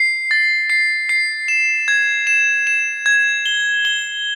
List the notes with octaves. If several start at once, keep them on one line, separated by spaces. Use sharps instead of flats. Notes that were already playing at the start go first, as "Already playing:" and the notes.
Already playing: C7
A6
C7
C7
E7
G#6
E7
E7
G#6
G7
G7